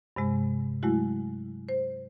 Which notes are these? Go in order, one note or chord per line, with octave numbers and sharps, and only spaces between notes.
G2 C3 G#3
F#3 G#3 A3 E4 F#4
C5